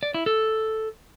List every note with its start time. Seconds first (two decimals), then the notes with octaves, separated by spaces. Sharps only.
0.03 D5
0.14 E4
0.26 A4